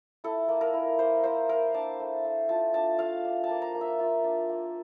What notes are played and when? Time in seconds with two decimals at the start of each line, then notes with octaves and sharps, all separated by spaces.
0.24 E4 A4
0.49 A#3
0.61 A#4
0.74 E4
0.99 A#3 C5
1.23 E4 C5
1.49 A#3 A#4
1.74 D4 A5
2.00 A3
2.25 A3
2.49 F4 A5
2.74 D4 A5
2.99 A3 F5
3.25 D4
3.44 A5
3.49 A#3
3.62 A#5
3.75 A#3
3.81 E5
3.99 F4
4.24 D4
4.49 A#3